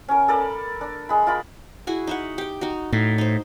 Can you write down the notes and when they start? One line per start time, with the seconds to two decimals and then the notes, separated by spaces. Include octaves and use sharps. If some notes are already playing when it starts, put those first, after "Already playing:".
0.08 C#4 A#4
0.28 A4 A#4 D5 B5
0.81 D4
1.09 G#3 B5
1.27 F4 A#4 D5 B5
1.87 E4 F#4 G#4
2.07 D#4 E5 F#5
2.38 G4 G5
2.61 D#4 F#4
2.92 A2 D#4
3.18 D#4 C5